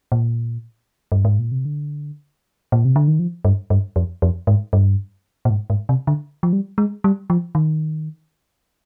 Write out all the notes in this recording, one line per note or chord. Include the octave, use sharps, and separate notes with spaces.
A#2
G2
G#2
A#2
C3
D3
A#2
C3
D3
D#3
F3
G2
G2
F2
F2
G#2
G2
A#2
G#2
G#2
C3
D3
F3
G3
G#3
G3
F3
D#3